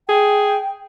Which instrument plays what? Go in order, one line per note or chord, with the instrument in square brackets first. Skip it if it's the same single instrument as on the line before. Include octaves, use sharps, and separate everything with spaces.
[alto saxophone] G#4 [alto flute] G5